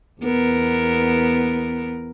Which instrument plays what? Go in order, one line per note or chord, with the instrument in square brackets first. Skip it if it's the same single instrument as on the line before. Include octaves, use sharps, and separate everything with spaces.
[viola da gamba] E2 B3 A#4